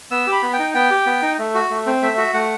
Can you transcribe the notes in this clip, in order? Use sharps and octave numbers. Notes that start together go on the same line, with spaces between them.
B3 E6
G4
B5
B3
G5
D#4
B3 G5
G4
B3
D#4
A3
F#4
A3
C4
A3 E5
F#4
A3 F#5